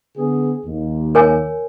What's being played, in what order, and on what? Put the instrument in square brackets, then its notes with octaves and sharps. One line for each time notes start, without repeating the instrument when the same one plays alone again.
[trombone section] D3 B3 G#4
D#2
[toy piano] A#4 C#5 G#5